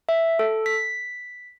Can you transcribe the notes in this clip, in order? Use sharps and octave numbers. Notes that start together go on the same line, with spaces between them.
E5
A4
B6